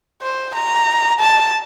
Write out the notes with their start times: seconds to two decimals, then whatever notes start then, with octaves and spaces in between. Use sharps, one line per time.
0.22 C5
0.55 A#5
1.20 A5